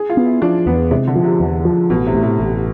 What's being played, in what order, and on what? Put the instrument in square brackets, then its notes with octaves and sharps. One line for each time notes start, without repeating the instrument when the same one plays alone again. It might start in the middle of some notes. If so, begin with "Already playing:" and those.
Already playing: [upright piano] G#4
F4
[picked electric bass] B3
[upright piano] E4
[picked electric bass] F3 [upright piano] D4
[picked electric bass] E2 [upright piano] B3
[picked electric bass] C3 [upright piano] G#3
[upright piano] D3
[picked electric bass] F3
[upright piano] C3
[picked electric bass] E2
F3
[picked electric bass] A1 [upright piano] B2
[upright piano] C3
[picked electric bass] A2
[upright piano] C3
[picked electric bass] A1